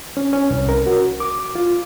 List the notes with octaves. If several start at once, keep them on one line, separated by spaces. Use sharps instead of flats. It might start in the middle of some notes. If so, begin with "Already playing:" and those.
C#4
C#4
C2
A#4
F#4
D6
F4